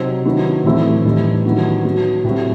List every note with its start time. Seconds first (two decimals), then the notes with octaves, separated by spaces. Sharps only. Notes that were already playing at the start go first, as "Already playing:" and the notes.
Already playing: C3 F#3 C4 D#4
0.25 D#3 F#3 B3 E4
0.64 A2 E3 A3 C4 E4
1.05 A2 E3 G3 D#4
1.45 D#3 F#3 B3 E4
1.84 F#3 B3 F#4
2.24 A2 G3 C4 F#4